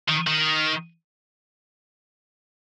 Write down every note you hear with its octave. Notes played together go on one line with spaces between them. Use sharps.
D#3
D#3